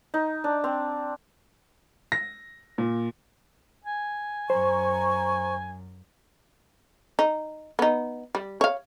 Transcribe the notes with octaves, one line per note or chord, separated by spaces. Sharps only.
D#4
D4
C4
A#6
A#2
G#5
F#2 C5 A#5 C#6
D#4
B3 D#4
G3
C#5 F5